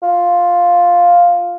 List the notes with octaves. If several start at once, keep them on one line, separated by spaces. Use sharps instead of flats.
F4